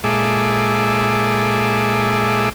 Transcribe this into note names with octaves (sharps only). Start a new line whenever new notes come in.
A#2 G#3 G#4 A4 E5 D6